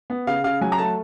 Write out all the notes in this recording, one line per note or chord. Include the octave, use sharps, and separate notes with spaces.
B3
C#3 F5
C#3 F5
F#3 G#5
A#5
A3 A5